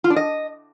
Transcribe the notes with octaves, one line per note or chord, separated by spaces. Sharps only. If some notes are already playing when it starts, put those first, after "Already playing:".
F4
D4
D#5